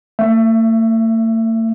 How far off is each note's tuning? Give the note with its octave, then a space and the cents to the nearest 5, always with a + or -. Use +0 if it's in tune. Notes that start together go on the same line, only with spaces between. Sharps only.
A3 +45 E5 +20